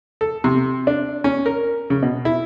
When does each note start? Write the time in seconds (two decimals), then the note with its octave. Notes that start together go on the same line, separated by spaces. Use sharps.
0.21 A4
0.44 C3
0.87 D4
1.24 C#4
1.46 A#4
1.90 C#3
2.02 B2
2.25 E4